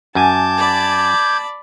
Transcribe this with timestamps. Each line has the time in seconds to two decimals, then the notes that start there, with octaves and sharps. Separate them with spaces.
0.15 F#2 G#5 A5 D6 G6 G#6
0.58 D5 B5